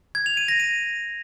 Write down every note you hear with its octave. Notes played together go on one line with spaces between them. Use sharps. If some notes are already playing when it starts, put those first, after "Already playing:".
G#6
F7
D#7
A#6
D#7